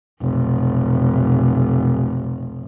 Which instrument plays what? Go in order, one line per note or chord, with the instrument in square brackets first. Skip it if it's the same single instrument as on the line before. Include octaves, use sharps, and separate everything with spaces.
[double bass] F1 B1